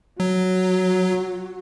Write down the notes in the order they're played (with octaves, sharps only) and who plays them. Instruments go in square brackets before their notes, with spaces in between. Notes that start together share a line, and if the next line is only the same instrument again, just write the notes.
[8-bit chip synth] F#3 [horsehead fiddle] F#4